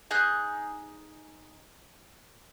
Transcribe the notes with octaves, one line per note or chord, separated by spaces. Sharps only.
D#4 G#4 F#6 G6